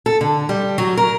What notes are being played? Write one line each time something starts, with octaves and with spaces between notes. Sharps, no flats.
A4
D3
G3
F#3
A#4